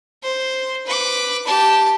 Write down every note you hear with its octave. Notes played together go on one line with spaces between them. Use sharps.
C5
B4 D6
G4 A5